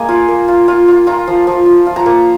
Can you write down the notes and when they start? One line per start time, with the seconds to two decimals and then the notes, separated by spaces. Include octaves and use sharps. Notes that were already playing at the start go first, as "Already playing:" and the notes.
Already playing: G#3 A#3 G#5
0.09 F4
0.28 A#3
0.48 F4
0.68 F4
0.88 F4
1.07 F4 A#5
1.28 F3
1.47 F3
1.66 F4
1.87 F4
1.96 A#5
2.06 A#3